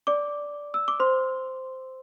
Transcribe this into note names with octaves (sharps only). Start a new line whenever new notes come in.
D5 D6
E6
D6
C5 C6